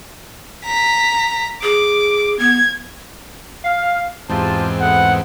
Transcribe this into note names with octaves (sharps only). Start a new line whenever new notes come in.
A#5 B6
G#4 D6
B3 G#6
F5
E2 G#2 C4 F4 G4 A5
F3 A3 B3 F#5